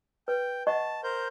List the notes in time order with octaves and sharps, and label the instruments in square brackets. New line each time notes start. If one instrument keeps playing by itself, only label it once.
[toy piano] B4 [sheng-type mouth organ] G5
[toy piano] D#5 F#5 C#6 [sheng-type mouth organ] A5
[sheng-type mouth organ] A#4 C5 G6